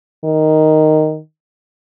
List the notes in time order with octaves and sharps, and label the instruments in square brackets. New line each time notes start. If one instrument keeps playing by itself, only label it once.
[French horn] D#3